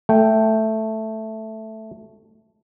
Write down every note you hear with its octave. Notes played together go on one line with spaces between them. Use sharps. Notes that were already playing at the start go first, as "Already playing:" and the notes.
A3 G5